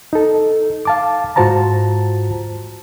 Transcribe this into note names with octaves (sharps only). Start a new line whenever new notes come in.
D#4 A4
F5 A5 D6
G#2 F4 F#4 C5 A5 A#5